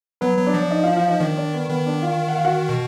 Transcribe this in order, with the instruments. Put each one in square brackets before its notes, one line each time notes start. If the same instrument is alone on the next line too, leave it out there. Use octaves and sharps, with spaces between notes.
[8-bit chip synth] F#3 [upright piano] B3 B4
[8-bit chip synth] F#3
[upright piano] D4 D5
[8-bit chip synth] F3
[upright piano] D5
D#4 D#5
F4 F5
F4 F5
D#4 D#5
[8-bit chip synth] D#3 [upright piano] D4 D5
[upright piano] D4 D5
B3 B4
[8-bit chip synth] D#3 [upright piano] B3 B4
[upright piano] D4 D5
F4 F5
F#5
F5
F#4 F#5
[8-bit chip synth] B2